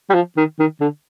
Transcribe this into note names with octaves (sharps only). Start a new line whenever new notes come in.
G3
F3
D#3
D#3
D3